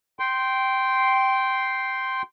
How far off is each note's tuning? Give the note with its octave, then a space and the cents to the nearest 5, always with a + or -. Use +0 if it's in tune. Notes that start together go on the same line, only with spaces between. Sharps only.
G5 -10 C6 +0